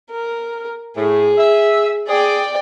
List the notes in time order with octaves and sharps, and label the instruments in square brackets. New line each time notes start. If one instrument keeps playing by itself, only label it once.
[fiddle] A#4
[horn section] A2 [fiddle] G#4
[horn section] E5
[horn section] G#4 [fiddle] D5 G5